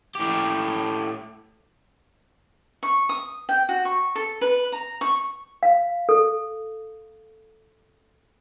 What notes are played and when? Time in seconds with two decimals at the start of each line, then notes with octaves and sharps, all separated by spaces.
0.15 A2 G4
2.83 C#6
3.09 D#6
3.49 G5
3.69 F#4
3.85 C#6
4.15 A4
4.41 B4
4.72 A#5
5.01 C#6
5.63 F5
6.09 A4